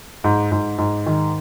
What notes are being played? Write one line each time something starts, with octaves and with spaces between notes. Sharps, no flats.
G#2
G#2
G#2
D#3